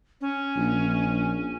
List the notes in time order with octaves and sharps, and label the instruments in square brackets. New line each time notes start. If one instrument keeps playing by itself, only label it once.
[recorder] C#4
[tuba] A#1